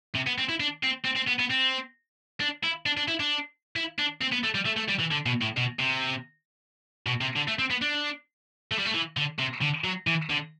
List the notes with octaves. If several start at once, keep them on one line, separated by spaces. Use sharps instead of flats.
C3
B3
C4
E4
D4
C4
C4
C4
B3
B3
C4
D4
E4
D4
D4
E4
D4
E4
D4
C4
B3
A3
G3
A3
A3
G3
E3
D3
B2
A2
B2
C3
B2
C3
D3
A3
C4
B3
D4
A3
G3
A3
E3
D3
C3
D3
F#3
E3
D3